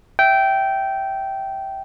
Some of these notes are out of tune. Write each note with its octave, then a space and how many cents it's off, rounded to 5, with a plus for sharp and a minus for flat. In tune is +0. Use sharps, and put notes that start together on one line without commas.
E5 +0 G5 -15